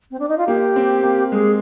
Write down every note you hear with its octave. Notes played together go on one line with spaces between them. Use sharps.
C4
D4
D#4
F4
A#3 G4
C4
A#3
G#3 G#4